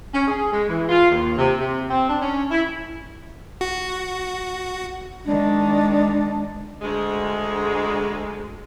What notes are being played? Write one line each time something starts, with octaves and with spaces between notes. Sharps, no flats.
C#4
G#4
G#3
E3
F4
D#2
C3
C3
C4
D4
C#4
E4
F#4
D#3 G#3 D4
D2 G#3